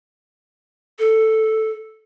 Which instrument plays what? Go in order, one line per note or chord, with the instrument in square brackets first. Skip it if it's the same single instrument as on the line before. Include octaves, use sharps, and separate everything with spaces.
[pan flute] A4